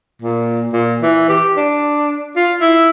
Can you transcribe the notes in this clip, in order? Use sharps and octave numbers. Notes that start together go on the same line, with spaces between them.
A#2
A#2
E3
G4
D4
F4
E4